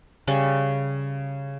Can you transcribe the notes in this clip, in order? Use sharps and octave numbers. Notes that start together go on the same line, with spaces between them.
C#3 G3 C#4